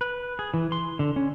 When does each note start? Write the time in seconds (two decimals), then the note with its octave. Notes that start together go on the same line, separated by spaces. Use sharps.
0.01 B4
0.39 G#4
0.54 E3
0.72 C6
0.99 D3
1.16 C#4